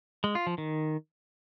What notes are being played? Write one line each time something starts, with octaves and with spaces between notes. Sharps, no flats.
G#3
F4
F3
D#3